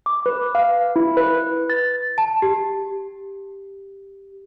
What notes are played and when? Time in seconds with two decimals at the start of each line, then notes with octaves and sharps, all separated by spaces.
0.06 D6
0.26 B4
0.55 F5
0.96 E4
1.17 B4
1.70 A6
2.18 A5
2.42 G4